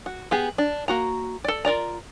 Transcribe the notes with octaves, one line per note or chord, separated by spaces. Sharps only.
F#4
B3 G4 G#4
D4
A#3 F#4 A#5
A4 D5
F4 A#4 D5 A#5